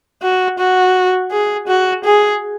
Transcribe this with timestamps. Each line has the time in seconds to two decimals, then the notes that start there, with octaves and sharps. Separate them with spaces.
0.22 F#4
0.59 F#4
1.31 G#4
1.68 F#4
2.04 G#4